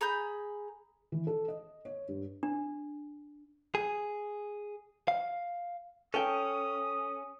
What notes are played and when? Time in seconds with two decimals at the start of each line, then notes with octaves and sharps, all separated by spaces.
0.01 G#4 A#5 B5 G6
1.12 E3
1.27 A4
1.48 D#5
1.85 C#5
2.08 G2
2.43 D4
3.75 G#4
5.08 F5
6.14 C#4 A4 G5 D#6